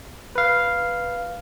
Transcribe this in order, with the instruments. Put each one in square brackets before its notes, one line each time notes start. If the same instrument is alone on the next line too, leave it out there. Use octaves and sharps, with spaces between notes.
[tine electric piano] B4 F5